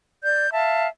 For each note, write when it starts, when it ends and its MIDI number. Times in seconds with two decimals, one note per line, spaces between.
0.23 0.49 74
0.23 0.49 91
0.51 0.87 76
0.51 0.87 77
0.51 0.87 81